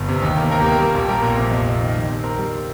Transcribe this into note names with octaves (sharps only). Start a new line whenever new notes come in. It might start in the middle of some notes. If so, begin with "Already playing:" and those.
Already playing: G1
C3
D#2 G4
A#3
A#3 A#4
G4
A#3
A#4
G3
A#1 G4
G3 A#4
A#2
C3
F2
F2
D#3
G3
C4
C4 A#4
G3